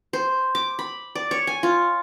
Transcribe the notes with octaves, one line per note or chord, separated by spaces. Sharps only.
C5
D6
B5
D5
C#5
G#5
F4